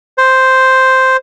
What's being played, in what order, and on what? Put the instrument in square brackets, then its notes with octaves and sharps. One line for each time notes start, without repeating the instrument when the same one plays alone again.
[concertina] C5